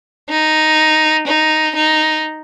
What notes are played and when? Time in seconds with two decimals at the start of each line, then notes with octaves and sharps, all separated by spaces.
0.30 D#4
1.27 D#4
1.75 D#4